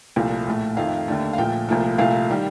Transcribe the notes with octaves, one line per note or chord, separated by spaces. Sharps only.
C2 A#2 F3 A3
A#1 A2 A3
F2 D#3 A3 F5
D#2 D3 A3
F5
A#1 A#2 F3 A3 G5
C2 A#2 F3 A3
C2 A#2 F3 A3 F5
D#3 G3